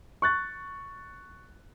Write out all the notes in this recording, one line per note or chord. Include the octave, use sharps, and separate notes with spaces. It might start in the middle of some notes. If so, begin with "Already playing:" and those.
C#6 F#6 A6